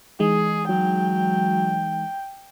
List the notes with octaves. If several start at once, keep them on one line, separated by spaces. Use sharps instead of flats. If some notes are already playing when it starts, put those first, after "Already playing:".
E3 G#3 D#4 G#4
F#3 G5